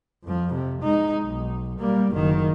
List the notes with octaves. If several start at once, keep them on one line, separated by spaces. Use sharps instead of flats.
F2 F3
C3
G#3 D#4
B1
G3 A#3
F#1 D#3